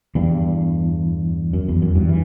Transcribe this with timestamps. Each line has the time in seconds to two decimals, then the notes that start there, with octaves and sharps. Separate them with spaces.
0.15 E2 G2
1.53 F#2
1.68 E2
1.82 F#2
1.95 E2 G2
2.09 E3